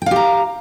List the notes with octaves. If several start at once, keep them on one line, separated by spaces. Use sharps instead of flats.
G4 F5 G5 A#5